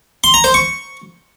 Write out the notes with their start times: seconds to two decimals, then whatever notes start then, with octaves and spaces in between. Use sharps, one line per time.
0.24 C6
0.34 A#5
0.44 C5
0.54 C#6